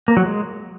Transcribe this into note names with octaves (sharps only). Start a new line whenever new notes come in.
A#3
F#3
G#3